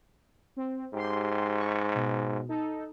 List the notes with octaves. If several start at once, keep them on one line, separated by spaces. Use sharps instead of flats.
C4
G#2 G4 C6
C#6
B2
D#4 A4